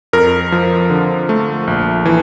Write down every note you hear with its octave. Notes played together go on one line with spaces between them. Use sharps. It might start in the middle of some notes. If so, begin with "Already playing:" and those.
F2 A#4
F3
D3
A3
A#1
E3